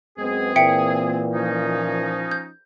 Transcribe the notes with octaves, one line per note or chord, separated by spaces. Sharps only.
F#2 G#3 B3 C4 G#4
A#2 E3 E5 G5 C#7
F3 C#4 D#4
G6